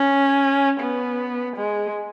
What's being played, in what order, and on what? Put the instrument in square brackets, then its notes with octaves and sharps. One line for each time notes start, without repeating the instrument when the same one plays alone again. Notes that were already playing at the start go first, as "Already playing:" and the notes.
Already playing: [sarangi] C#4
B3
G#3